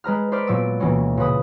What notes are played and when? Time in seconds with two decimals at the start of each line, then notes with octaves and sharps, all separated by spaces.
0.04 G#3 B4 A#5 F6
0.32 B4 C5 D5 D6 F6 B6
0.47 A#2 F#3 B3 A5 E6 D7
0.80 D2 B2 E3 A#3 C#4
1.17 A#2 C#3 B4 D#6